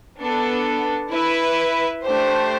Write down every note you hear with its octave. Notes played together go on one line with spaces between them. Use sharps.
B3 D4 A4
E4 B4 E5
A3 D4 G4 C5